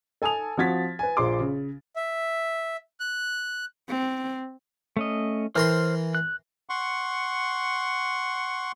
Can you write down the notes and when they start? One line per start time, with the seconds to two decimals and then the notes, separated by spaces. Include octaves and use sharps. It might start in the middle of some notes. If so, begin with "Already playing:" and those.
0.22 A4 G#5 A5 D#6 F7
0.57 F3 C4 F#4 G#6 A6 B6
0.99 B4 G#5
1.17 A#1 F4 G#4 C6 D6
1.40 C#3
1.96 E5
3.00 F#6
3.89 C4
4.97 A3 C#4 D#5
5.56 E3 A#4 C5 C6 F6
6.15 F#6
6.69 F#5 C6 C#6